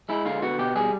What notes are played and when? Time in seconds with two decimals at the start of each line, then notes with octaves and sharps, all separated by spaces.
0.09 G#3 E4
0.26 D3 F4
0.42 B3 F#4
0.59 B2 G4
0.76 G3 G#4